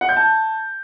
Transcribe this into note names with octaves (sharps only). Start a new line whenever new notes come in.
F#5
G6
A5